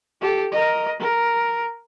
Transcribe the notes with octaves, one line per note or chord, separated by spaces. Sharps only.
G4 A4
A#4 D#5
A#4